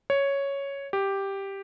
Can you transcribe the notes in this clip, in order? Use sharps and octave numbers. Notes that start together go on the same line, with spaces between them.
C#5
G4